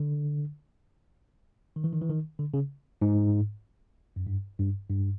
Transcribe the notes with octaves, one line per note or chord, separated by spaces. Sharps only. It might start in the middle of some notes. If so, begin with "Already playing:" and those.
Already playing: D3
D#3
E3
D#3
E3
D#3
D3
C#3
G#2
F#2
G2
G2
G2